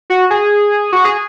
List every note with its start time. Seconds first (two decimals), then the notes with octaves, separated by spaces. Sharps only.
0.10 F#4
0.31 G#4
0.93 F#4
1.05 G#4